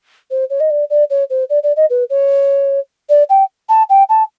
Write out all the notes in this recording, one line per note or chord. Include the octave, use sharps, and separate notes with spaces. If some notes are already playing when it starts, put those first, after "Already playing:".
C5
C#5
D#5
D5
D5
C#5
C5
D5
D5
D#5
B4
C#5
D5
G5
A5
G5
A5